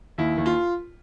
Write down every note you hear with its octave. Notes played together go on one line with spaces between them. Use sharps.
D#2 E4
D#2
F4